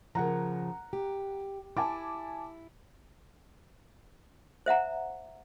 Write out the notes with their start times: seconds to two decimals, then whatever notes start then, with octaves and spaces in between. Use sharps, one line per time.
0.15 C#3 F3 A#4 F#5 A#5
0.93 G4
1.77 E4 G#5 A5 D6
4.66 C5 E5 F#5 A#5